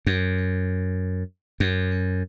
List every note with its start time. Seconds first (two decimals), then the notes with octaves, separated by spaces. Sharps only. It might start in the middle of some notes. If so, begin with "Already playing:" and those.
0.06 F#2
1.60 F#2